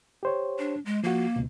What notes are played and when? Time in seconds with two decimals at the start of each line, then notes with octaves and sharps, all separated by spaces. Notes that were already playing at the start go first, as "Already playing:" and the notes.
0.23 G4 C5 C#5
0.59 D4
0.86 G#3
1.04 F3 A#3 F#4
1.36 C#2 B2